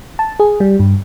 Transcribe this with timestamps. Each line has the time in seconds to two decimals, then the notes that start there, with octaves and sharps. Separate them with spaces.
0.19 A5
0.40 G#4
0.60 G3
0.80 G2